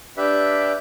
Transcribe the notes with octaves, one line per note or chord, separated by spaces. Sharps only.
D4 G4 B4 E5